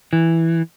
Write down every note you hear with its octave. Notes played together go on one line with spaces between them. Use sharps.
E3